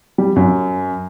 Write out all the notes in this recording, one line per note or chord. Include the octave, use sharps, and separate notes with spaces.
G3
F#2